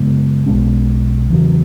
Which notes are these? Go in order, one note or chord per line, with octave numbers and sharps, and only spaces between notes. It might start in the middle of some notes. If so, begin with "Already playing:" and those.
Already playing: F#2 C#3 G#3 B3
B1 B2 G#3 C#4
E2 C#3 F#3